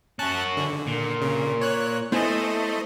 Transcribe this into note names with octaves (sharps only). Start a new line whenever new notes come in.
C#4 F#4 A5 F#6
D3
A#2
C#3
C#5 F#6
A3 B3 E4 C5 D#5 G#5